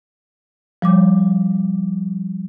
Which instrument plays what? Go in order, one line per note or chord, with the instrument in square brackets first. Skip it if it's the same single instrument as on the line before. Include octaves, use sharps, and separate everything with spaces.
[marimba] F3 G3 D6